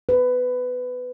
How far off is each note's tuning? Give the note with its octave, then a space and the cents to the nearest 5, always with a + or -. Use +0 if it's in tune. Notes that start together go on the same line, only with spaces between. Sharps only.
B4 +15